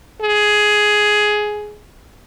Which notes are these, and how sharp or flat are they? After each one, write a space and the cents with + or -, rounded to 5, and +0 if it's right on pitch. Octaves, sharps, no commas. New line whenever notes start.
G#4 +10